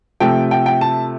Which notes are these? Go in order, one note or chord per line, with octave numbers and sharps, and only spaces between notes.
C3 F3 A3 G5
G5
G5
A5